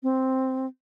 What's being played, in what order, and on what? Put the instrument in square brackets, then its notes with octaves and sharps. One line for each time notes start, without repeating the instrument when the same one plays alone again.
[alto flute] C4